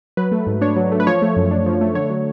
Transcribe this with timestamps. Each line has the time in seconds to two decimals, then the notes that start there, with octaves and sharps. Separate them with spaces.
0.17 F#3 B4
0.32 A3
0.47 G#2
0.61 D4 C#5
0.76 F#3
0.92 A3
1.00 B4
1.07 F3 C#5
1.22 A3
1.37 F#2
1.51 D4
1.66 F3
1.81 A3
1.95 D3 C#5
2.10 F#3